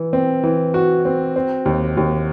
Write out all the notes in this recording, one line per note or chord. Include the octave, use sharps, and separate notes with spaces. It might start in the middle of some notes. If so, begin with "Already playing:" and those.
Already playing: E3
C4
E3
F#4
C4
C4
D#2
D#2